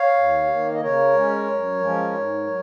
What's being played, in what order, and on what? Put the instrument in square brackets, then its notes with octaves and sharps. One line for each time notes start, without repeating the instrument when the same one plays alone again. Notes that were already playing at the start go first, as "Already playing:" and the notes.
Already playing: [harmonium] C#5 F5
D#2
D#3 A#3
D#5
C#3 A#4 C#5
G#3 C#4
F#2
F3 G#3 C#4
G#2
F#3